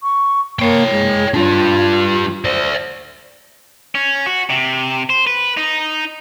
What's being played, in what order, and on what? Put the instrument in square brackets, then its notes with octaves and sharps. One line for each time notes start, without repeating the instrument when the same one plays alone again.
[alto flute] C#6
[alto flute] A#3 [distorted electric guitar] C#5 G5
[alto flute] G#3
[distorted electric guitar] G3 D4 [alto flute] F4
[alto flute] C5 [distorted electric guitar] D5 E5
[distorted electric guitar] C#4
F#4
C3
C5
B4
D#4